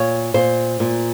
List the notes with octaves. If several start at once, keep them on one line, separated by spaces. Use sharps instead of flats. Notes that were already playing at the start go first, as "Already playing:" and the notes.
Already playing: A#2 C#5
A#2 C5
A#2